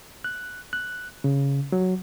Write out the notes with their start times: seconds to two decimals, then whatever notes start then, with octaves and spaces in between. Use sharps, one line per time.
0.24 F#6
0.73 F#6
1.24 C#3
1.72 F#3